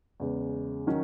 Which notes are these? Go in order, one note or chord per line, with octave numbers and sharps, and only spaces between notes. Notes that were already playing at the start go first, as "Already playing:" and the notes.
E2 C#3 G#3
D#3 F#3 C#4